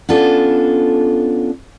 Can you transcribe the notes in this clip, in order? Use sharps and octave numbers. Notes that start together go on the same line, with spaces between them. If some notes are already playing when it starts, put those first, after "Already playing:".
B3 C#4 D4 F4 A4